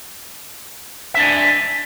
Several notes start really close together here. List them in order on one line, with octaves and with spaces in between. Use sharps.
E5 D4 D5 G#5